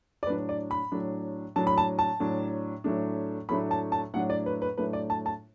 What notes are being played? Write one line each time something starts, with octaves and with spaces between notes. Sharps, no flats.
D5
A2 F#3 D4 B4
D5
B5
A2 F#3 D4
A2 F#3 D4 A5
B5
A5
A5
A2 F#3 D4
A2 F#3 A3 D4
A2 F#3 A3 D4 B5
A5
A5
A2 F#3 A3 D4 F#5
D5
B4
B4
A2 F#3 A3 D4 B4
D5
A5
A5